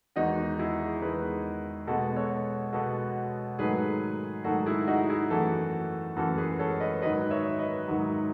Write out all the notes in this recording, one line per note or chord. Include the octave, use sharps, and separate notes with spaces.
E2 D#3 G#3 D#4 F#4
E4 G#4
E2 D#3 G#3 G#4 B4
B2 G#3 B3 F#4 A4
A4 C#5
B2 G#3 B3 F#4 A4
G#2 D#3 F#3 A3 G#4 B4
G#2 D#3 F#3 A3 F#4 A4
E4 G#4
D#4 F#4
E4 G#4
F#2 E3 A3 F#4 A4
F#2 E3 A3 F#4 A4
G#4 B4
A4 C#5
B4 D#5
G#2 D#3 F#3 B4 D#5
C#5 E5
B4 D#5
G#2 D#3 F#3